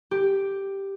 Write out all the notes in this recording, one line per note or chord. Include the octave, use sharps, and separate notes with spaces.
G4